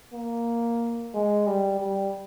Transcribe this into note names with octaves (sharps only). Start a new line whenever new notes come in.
A#3
G#3
G3
G3